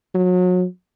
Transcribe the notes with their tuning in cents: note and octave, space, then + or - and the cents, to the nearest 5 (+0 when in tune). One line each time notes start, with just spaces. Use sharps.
F#3 -30